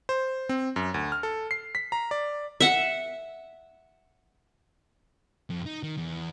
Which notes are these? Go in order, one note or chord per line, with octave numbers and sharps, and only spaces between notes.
C5
C4
F#2
D2
F6
A4
C7
B6
A#5
D5
E5 F#5
F2
D#4
D#3
E2